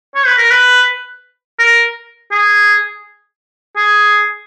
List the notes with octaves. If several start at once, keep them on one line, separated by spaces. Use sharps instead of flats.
C#5
B4
A#4
B4
A#4
G#4
G#4